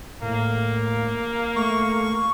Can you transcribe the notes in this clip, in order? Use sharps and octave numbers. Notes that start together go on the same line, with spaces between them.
A2 A#3
A3 C#6